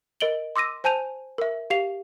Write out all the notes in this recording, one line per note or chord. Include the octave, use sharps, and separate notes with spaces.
A#4 D#5 D7 F#7 G7
C6 D6 E6 A#6 D#7
C5 G#5 A5 G6 D#7 F7
A#4 E5
G4 F5 C7 F7